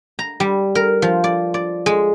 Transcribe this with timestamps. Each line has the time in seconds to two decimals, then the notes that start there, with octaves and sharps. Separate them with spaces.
0.19 A#5
0.40 G3
0.75 A#4
1.02 F3
1.24 D5
1.54 D5
1.86 G#3